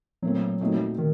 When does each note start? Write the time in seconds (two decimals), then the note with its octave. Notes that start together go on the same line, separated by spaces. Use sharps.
0.22 A#2 F#3 A3 C4
0.61 A#2 A3 C4 D#4 F#4
0.98 D#3